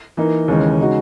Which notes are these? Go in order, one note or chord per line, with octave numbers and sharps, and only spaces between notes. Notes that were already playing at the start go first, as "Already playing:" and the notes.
E3 A#3 D#4 A#4
D#2 C#3 E3 G#3 C#4
C#3 G#3 D#4 F#4